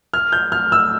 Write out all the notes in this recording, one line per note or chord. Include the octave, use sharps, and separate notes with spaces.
F6
G6
F6
E6